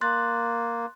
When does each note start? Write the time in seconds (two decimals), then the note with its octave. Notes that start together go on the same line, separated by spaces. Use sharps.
0.01 A#3 C6 F#6 A6